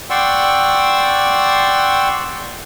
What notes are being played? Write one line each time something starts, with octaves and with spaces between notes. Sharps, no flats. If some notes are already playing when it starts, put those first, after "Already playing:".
D5 F#5 G5 C6 C#6 E6